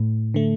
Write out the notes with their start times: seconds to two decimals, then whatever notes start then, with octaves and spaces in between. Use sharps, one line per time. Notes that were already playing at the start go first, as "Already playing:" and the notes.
Already playing: A2
0.34 D3 A3